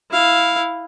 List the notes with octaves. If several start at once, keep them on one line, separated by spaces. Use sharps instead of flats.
E4 F5